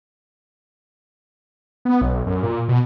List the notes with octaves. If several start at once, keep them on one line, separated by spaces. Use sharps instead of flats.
B3
B1
F#2
A#2
B2